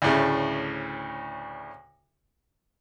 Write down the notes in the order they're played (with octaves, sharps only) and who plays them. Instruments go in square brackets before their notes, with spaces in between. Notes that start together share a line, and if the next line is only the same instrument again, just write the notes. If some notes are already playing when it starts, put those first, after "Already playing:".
[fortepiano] D2 A2 C#3